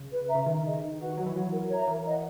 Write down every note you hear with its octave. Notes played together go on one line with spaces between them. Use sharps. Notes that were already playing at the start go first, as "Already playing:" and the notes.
Already playing: C#3
B4
E5 A#5
C#3
D#3 D#4
G#4 D#5
D#4
F#4 B4 F#5
F#3 F#4
E3
F#3 C#5 F#5
A#4
C#5 E5 A#5
E3 A#4
D#5 F#5